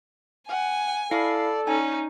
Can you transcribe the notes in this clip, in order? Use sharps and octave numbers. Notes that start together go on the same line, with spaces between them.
F#5 G#5
E4 A4 D5 F5 C7
C#4 D#4 G#5